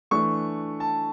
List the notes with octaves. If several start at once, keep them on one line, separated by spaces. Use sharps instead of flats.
E3 A3 D4 C#6
A5